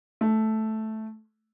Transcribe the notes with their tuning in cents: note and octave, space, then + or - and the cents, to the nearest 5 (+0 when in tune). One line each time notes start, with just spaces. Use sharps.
A3 -5